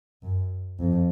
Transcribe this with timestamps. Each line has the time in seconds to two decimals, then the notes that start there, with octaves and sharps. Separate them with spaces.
0.22 F#2
0.79 F2